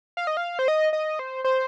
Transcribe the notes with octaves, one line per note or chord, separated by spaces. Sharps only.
F5
D#5
F5
C5
D#5
D#5
C5
C5